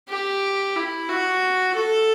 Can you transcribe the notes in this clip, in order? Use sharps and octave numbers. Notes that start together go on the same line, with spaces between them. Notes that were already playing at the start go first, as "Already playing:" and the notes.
G4
E4
F#4
A4